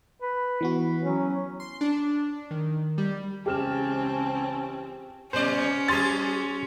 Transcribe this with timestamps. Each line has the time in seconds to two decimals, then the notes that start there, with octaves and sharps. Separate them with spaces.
0.22 B4
0.61 E3 B3 F#4
1.03 F#3 C#4
1.60 C6
1.81 D4
2.51 D#3
2.98 G3
3.46 C#2 E3 C4 C#4 G4 A5 F6 E7
5.33 A#2 G3 C#4 C5 D5
5.88 F#3 G4 G#4 C6 A6